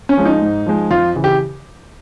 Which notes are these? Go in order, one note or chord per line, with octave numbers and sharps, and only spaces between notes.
C#4
F3 G#3
D#4
G#2
F3 G#3
F2 F4
C#3 E3
G4